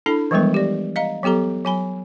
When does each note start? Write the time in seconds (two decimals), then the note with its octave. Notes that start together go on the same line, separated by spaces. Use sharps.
0.06 D4 E4 A4 B5
0.31 E3 F3 G3 G#3 B3 A#4
0.54 G4 D5
0.96 D#5 F5 A#5
1.23 F#3 B3 G4 A4 A#5
1.65 F#3 G#5 B5